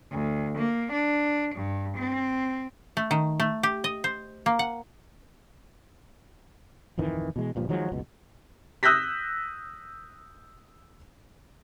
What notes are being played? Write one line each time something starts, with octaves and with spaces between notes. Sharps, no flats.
D2
A#3
D4
G2
C4
A3
D#3
A3
G4
D#5
C5
A#3
F#5
D1 F2 D#3 E3
B2 E3 G#3
D1 G2 A#2 F3
D#3 F3 F#3 G#3
F#1 C#2 B2
D#6 E6 F#6 G6 A#6 B6